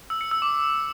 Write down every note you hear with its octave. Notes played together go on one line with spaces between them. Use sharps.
E6
C#7
E6
D6